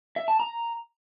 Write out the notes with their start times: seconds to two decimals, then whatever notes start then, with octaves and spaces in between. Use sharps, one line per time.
0.16 E5
0.28 A5
0.40 A#5